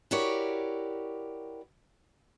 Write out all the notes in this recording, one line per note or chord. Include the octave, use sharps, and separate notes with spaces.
E4 F#4 G4 A#4 C#5 D5